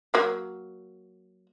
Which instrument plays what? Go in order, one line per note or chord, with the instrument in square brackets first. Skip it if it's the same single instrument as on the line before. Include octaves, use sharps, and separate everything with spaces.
[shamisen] F#3 A#3